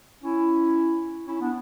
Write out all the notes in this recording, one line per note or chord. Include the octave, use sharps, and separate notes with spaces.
C#4 E4
C#4 E4
B3 D4